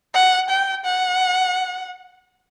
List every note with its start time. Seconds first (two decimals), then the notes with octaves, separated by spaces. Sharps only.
0.14 F#5
0.49 G5
0.85 F#5